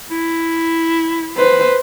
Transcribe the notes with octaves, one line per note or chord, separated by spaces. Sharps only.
E4
B4 C5